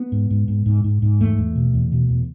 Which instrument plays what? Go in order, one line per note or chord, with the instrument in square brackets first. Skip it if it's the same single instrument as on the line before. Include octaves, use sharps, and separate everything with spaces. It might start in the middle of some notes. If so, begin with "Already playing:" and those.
Already playing: [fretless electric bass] B3
G#2
G#2
G#2
G#2
G#2
G#2
E2 A3
E2
B2
E2
B2
E2